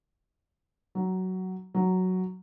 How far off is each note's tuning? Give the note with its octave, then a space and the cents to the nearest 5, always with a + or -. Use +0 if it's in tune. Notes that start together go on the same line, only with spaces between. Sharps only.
F#3 +10
F#3 +0